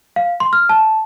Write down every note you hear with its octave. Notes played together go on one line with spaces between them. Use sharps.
F5
C6
F6
A5